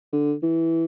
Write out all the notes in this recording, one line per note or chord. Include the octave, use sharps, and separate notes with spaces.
D3
E3